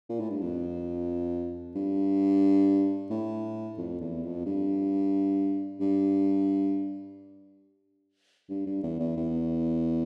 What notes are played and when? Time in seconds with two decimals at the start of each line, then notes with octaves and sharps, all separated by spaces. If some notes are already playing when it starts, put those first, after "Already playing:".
0.09 A#2
0.20 A2
0.30 G2
0.41 F2
1.75 G2
3.10 A2
3.78 F2
4.00 E2
4.23 F2
4.45 G2
5.80 G2
8.49 G2
8.66 G2
8.83 E2
8.99 E2
9.16 E2